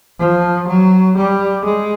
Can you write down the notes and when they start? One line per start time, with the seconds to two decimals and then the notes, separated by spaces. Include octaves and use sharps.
0.19 F3
0.68 F#3
1.17 G3
1.65 G#3